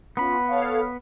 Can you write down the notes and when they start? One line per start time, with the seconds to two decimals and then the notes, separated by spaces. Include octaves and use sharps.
0.17 B3 C#4 F4 B5
0.48 A4 C#5 F5